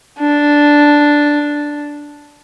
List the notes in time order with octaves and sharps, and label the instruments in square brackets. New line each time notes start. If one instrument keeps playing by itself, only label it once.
[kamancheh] D4